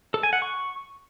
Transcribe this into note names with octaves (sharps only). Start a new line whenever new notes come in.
A4
G#5
F#5
C#6